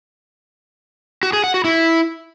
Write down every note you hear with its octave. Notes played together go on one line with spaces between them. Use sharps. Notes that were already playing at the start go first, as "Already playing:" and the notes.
F#4
G#4
F#5
F#4
E4